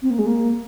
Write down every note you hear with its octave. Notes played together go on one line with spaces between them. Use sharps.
C4
A#3
G#3
A#3